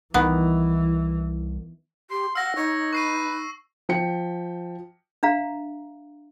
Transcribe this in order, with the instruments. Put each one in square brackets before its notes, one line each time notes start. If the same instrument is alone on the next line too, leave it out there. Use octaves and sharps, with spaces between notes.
[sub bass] C2 [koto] D#3 B3 [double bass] E3
[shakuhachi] G4 [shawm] C6
[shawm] F5 [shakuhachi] F#5 [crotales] E6 A#6
[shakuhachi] D#4 [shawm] C#5
[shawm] B4 [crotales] C#6 C7 D#7
[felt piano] F3 G5 C#7
[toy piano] D4 E5 F5 A#5